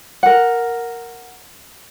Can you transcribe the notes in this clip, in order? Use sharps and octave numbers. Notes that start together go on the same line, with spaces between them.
A#4 F#5